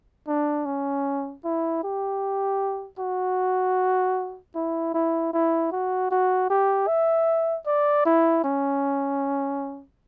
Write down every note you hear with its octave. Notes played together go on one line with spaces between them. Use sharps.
D4
C#4
E4
G4
F#4
E4
E4
E4
F#4
F#4
G4
E5
D5
E4
C#4